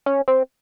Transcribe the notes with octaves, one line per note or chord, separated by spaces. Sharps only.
C#4
C4